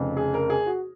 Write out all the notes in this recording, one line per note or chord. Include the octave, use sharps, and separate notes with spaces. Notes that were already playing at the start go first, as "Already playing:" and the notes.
Already playing: F1 F2 C#3
G#4
A#4
G#4
F#4